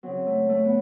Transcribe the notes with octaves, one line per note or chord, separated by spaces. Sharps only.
C#3 F#3 C4
A3
A3
B3